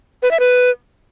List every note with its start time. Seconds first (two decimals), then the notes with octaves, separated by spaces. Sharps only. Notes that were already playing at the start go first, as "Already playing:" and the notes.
0.23 B4
0.31 E5
0.40 B4